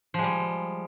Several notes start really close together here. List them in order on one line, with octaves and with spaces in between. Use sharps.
F3 G#3 G3